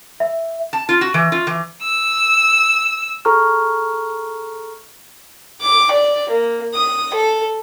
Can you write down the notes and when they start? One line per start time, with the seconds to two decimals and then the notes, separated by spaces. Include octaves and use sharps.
0.20 E5
0.73 A5
0.89 F4
1.01 F#4
1.14 E3
1.32 F4
1.47 E3
1.82 E6
3.25 G#4 A4 A#5 C#6 F6
5.61 D6
5.92 D5
6.29 A#3
6.75 D#6
7.14 A4